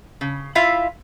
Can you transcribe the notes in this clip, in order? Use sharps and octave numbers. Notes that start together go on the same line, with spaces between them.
C#3
E4 F4 E5 F5